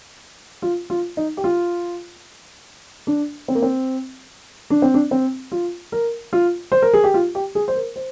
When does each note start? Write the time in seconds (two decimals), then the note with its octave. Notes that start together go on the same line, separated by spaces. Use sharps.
0.62 F4
0.90 F4
1.17 D#4
1.37 G4
1.44 F4
3.07 D4
3.48 C4
3.55 A#3
3.62 C4
4.70 D4
4.82 C4
4.94 D4
5.11 C4
5.52 F4
5.92 A#4
6.33 F4
6.72 C5
6.82 A#4
6.94 G#4
7.04 G4
7.14 F4
7.35 G4
7.55 G#4
7.68 C5
7.75 A#4
7.96 C5